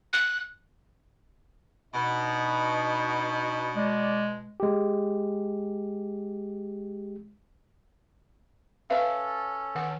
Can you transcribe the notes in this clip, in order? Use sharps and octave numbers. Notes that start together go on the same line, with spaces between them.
F#6
B2 D4 D#4 D#5
G#3 D5
G#3 G4
C#4 A4 B4 E5 F5
D#3 F#5